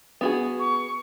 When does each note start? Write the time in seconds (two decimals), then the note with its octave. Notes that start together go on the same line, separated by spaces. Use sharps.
0.21 B3 F#4 G#4
0.59 C#6